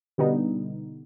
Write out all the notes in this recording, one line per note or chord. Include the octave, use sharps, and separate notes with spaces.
B2 D3 G3 B3 D#4